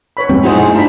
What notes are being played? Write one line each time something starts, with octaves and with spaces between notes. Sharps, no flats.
B4 C#5 B5
G#2 G3 C4
G2 A3 D#4 E4 F#4 G#4 C5 D#5
D4 F4 A#5 B5